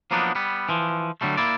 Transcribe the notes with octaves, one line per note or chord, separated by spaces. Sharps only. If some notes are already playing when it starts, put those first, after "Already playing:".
F3 F#3 A#3 B3 D4 D#4
G3 B3
E3 F3
D3 F#3 G3 A3
A#3 E4 D5